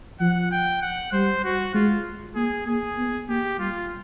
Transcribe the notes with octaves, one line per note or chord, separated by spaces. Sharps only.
F3 F#5
G5
F#5
G3 C5
F#4
G#3 F4
A#3 G#4
A#3 G#4
B3
A#3 G4
G3 F4